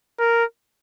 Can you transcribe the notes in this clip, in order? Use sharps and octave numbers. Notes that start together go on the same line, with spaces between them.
A#4